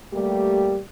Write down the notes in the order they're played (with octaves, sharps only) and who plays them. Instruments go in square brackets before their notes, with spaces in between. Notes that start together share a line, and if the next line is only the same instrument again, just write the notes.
[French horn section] G3 A3 A#3 G4